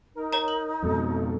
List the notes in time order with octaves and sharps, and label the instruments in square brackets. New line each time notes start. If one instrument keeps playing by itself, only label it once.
[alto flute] D#4 [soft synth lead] A#4
[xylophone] C#5 A#5
F#7
[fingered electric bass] F2 G#2 B2 [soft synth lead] A4